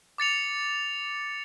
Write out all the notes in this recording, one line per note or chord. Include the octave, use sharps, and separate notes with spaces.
D6 A6 C#7 F7